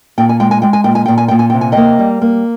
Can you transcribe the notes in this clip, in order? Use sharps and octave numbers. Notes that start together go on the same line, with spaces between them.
A#2 G5
G#5
G#3 G5
G#5
G#3 G5
G#5
A#2 G5
G#5
A#2 G5
G#5
A#2 G5
G#5
C3 G5
G#5
A#3 D#5 G5
G3
A#3